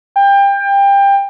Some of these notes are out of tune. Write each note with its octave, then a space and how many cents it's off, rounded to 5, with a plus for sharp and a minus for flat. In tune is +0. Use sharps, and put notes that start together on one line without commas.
G5 +25